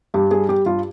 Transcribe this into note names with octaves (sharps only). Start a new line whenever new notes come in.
G2 G4
G3 G#4
G3 G4
G2 F4